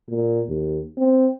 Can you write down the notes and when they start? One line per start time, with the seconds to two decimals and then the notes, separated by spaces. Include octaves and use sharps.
0.10 A#2
0.49 D#2
0.97 C4